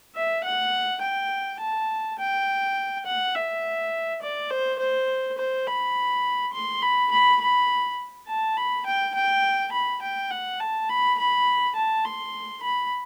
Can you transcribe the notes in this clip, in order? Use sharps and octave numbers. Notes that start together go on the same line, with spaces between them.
E5
F#5
G5
A5
G5
F#5
E5
D5
C5
C5
C5
B5
C6
B5
B5
B5
A5
B5
G5
G5
B5
G5
F#5
A5
B5
B5
A5
C6
B5